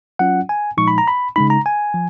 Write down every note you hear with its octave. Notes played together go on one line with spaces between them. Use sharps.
F#3 C#4 F4 F#5
G#5
A#2 F3 G#3 D#4 C#6
B5
A#5
B5
C#3 G#3 D#4 B5
A#5
G#5
F3